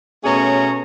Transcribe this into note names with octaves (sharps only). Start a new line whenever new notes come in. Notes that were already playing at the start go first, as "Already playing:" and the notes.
B2 A3 C#4 G#4 C#5 A#5